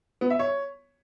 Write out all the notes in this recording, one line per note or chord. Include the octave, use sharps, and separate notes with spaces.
B3
E5
C#5